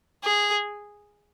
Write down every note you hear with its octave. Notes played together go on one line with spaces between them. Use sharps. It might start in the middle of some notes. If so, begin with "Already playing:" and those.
G#4